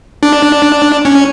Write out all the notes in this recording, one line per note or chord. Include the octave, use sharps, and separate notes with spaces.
D4
C#4